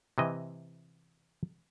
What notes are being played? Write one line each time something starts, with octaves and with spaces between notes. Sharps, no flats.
C3 E3 D#5